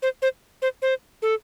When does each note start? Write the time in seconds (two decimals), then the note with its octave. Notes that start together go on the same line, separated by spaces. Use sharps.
0.02 C5
0.22 C5
0.62 C5
0.82 C5
1.22 A4